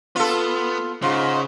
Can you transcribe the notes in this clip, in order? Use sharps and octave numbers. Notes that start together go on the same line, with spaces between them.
B3 F4 A4
G#2 C#3 F4